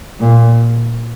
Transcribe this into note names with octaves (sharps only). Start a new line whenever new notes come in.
A#2